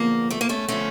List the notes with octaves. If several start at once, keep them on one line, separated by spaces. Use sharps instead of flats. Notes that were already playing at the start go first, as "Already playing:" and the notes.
Already playing: E2 D3 F3 A#3
A3
A#3
A3 C#4
D3 F3 A3 C#4